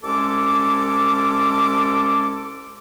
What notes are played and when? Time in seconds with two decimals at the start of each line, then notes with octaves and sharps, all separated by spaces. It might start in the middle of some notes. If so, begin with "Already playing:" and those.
0.04 C2 G#3 C#4 A4 D6